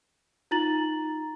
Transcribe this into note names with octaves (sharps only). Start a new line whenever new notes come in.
D#4 F4 A#5 A6 F#7